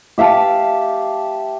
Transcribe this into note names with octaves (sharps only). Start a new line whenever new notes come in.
G4 E5 F5 A5